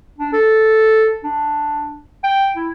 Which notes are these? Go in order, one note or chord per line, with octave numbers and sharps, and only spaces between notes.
D4
A4
D4
G5
E4